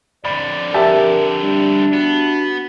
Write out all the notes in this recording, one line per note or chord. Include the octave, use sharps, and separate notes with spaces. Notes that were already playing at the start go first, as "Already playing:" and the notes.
F2 D3 D5 B5
G4 A#4 E5 A5
G3 D4
B3 F#4